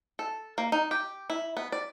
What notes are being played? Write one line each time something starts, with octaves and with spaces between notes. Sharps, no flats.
A4
A#3
D#4
G4
E4
B3
D5